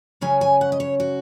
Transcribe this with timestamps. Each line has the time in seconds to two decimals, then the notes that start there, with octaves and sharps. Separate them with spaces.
0.21 C#3 F#3 C#4 G#5
0.41 G#5
0.61 F#5
0.72 D#5
0.80 C#5
1.00 F#4